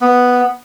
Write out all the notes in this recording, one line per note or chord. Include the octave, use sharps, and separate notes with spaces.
B3